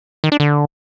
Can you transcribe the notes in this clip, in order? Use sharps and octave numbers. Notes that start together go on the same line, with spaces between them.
D#3
D4
D3